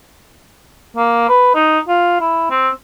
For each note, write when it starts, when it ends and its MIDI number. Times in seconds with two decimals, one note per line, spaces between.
0.96 1.24 58
1.29 1.53 71
1.55 1.79 63
1.88 2.19 65
2.20 2.50 64
2.50 2.69 60